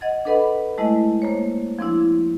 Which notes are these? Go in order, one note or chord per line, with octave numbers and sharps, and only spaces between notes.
D#5 F#5 G#6 A6
D4 A4 B4 D#5 F#5 B5
G#3 A3 E4 D#5
A#3 C5 C#5
F3 C4 D4 E4